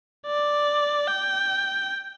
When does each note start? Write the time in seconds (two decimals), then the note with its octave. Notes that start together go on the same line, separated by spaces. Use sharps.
0.27 D5
1.08 G5